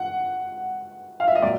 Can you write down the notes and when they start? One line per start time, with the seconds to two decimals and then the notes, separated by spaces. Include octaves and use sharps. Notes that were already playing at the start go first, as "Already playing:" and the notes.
Already playing: F#5
1.20 F5
1.28 E5
1.35 D#5
1.42 A#2 F#3 D5